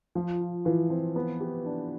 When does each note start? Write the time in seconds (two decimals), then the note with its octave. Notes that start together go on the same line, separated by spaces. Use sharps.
0.15 F3 F4
0.41 F4
0.65 E3 F4
0.90 C4
1.16 B3
1.40 G4
1.66 D4